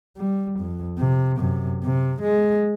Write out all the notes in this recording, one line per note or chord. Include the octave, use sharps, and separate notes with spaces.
G3
F2
C3
F#2 C3
C3
G#3